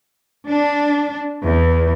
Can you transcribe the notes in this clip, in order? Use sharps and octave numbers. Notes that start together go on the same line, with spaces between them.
D4
E2